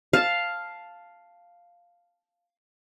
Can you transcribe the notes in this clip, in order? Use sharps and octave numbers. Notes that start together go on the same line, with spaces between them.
F5 A5